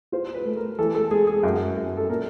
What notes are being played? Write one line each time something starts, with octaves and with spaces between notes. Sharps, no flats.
F4 C5
B4
A3
A#4
E3 A4
A4
G#3 G#4
G#4
F#2
F#2
A4
A#2 A#4